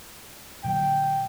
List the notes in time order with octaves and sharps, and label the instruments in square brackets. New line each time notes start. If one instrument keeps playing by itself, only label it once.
[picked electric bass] A#2 D3 F#3 [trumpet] G5